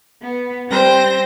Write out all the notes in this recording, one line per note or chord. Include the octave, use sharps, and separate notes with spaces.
B3
G3 C4 C5 G6 A#6